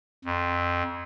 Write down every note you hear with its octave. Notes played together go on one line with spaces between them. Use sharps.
F2